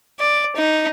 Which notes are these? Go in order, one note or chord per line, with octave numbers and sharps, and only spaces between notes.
D5
D#4